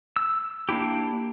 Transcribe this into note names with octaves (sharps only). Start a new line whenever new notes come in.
E6
A#3 D4 E4 G4